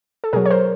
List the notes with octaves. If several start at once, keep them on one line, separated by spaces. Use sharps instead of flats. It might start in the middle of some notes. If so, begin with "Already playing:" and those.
A4
B2 F#3 G#4 A#4
C#5
A#4 C5